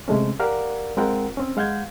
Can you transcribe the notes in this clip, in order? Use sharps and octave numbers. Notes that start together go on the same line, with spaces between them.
C3 G#3 A3 C#4
G4 A#4 D5 F5 F#5
G#3 C4 F4 A#4 F#5 G5
C4 C#4
G#3 F5 F#5 G6 G#6